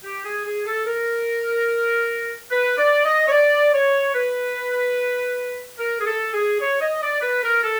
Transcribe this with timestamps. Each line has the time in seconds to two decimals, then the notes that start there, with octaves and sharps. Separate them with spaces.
0.04 G4
0.25 G#4
0.46 G#4
0.66 A4
0.86 A#4
2.51 B4
2.78 D5
3.05 D#5
3.27 C#5
3.32 D5
3.74 C#5
4.15 B4
5.79 A#4
6.00 G#4
6.06 A4
6.34 G#4
6.60 C#5
6.81 D#5
7.02 D5
7.22 B4
7.43 A#4
7.63 A4